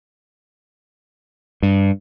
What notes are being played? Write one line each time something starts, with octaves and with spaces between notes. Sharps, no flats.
G2